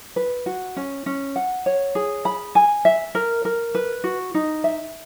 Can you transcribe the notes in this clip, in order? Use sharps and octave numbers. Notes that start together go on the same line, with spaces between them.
B4
F#4
C#4
C#4
F#5
C#5
G#4
B5
G#5
E5
A#4
A#4
B4
F#4
D#4
E5